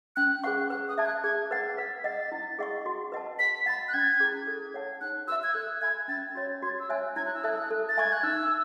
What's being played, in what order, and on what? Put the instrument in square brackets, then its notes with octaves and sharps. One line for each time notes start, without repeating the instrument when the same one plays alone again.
[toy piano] C#4 [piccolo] F#6
[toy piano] G#4 B4 F#5 C#6 [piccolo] F#6
[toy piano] B4 [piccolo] F#6
[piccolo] D#6
[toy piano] E5 A5 [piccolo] G#6
[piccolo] F#6
[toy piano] G#4 [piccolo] G#6
[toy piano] B4 F#5 [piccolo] A6
[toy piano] B4 [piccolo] B6
[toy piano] D#5 F#5 [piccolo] A6
[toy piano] E4
G#4 D#5 F#5 C#6
F#4
B4 D#5 F#5 A5
[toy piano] B4 [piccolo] B6
[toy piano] F#5 B5 [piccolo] A6
[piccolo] F#6
[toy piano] C#4 [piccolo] G#6
[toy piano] E4 G#4
A4
C#5 F#5 A5
[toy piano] D#4 [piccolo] F#6
[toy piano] F#4 B4 E5 [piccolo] E6
[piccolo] G#6
[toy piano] A4 [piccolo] F#6
[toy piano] E5 G#5 B5 [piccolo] G#6
[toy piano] C#4 [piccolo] A6
[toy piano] F#4 C#5 [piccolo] A6
[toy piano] F#4 [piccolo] G#6
[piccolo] E6
[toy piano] C#5 E5 G#5 [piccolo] F#6
[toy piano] E4 [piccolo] G#6
[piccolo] F#6
E6
[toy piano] A4 E5 A5 [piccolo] F#6
[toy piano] A4
[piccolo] A6
[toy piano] E5 G#5 C#6 [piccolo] G#6
[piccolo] F#6
[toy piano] D#4 [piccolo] E6